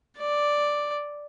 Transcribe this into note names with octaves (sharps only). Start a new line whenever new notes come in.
D5